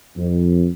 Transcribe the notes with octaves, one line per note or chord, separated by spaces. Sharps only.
F2